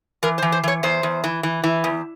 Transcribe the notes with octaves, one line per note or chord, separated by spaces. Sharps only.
E3 A#4
C5
E3
C5
E3 C#5
E2 C5
E2
E3
E3
E3
E2